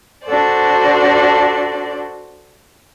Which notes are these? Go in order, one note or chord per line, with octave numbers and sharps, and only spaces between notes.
D4 F#4 A4 C5 D5